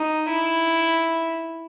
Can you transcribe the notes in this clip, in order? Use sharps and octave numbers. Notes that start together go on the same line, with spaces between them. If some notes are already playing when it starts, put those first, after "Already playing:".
Already playing: D#4
E4